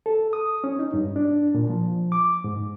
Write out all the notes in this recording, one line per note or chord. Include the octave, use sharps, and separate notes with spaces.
A4
D#6
C#4
D#4
G2
D4
A#2
F3
D6
G#2